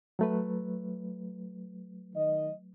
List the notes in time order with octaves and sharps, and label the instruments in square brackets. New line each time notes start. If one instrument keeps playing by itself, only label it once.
[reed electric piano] F#3 A3 B4
[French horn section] D#3 D#5